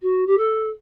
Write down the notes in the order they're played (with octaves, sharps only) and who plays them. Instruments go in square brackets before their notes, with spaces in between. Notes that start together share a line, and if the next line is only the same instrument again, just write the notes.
[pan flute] F#4
G4
A4